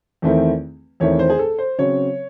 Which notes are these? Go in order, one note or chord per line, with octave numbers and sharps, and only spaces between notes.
E2 D#3 A3 C4 E4
E2 D#3 A3 C4 E4 C#5
C5
G#4
A4
C5
C#3 F#3 C4 C#5